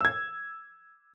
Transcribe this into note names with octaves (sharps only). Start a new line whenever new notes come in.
E6 G#6